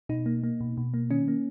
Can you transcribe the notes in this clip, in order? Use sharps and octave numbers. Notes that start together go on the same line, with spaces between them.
B2 D#4
A#3
A#3
B2
B2
A#3
D#3 C#4
A#3